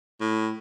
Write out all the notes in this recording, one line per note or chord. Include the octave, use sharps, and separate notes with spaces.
A2